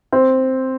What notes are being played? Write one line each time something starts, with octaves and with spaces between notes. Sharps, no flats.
C4